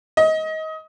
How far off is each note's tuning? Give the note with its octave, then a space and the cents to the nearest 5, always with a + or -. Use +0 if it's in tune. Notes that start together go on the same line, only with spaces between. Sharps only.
D#5 +25